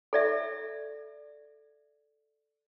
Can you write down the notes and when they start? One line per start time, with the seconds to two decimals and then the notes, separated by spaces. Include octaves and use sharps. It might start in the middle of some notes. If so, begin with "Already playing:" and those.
0.13 A4 D5 E5